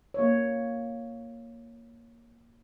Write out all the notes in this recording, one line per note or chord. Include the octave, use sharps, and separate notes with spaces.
A#3 C#5